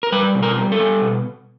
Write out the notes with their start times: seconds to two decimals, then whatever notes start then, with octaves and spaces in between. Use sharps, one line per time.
0.03 A#4
0.12 G3 B4
0.35 B2
0.43 A#4
0.57 G3
0.72 A4
0.79 G3
1.02 B2